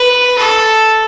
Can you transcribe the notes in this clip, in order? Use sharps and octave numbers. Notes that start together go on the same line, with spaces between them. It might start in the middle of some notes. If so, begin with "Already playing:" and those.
Already playing: B4
A4